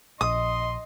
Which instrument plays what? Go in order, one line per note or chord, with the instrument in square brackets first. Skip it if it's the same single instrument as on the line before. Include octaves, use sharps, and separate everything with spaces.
[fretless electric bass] A#1 [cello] D#5 [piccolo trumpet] C6 [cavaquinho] D#6